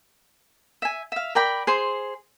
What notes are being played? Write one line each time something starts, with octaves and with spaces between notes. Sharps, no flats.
E5 G#5
E5 F5
A#4 D5 G5 B5
G#4 C5 C6